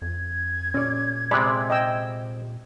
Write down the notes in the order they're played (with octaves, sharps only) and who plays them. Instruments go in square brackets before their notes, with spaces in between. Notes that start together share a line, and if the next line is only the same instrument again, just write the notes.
[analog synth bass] F2 [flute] G#6
[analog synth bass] A#2 [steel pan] C#4 D5
[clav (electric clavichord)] C3 G#3 [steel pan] D5 B5
[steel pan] D#5 G5 E6